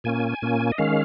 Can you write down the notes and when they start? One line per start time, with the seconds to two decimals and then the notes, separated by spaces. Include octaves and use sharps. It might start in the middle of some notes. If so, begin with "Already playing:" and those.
0.04 A#2 A#3 C#4 G#5
0.42 A#2 A#3 C#4
0.72 D#5
0.78 D#3 G#3 C#4 F5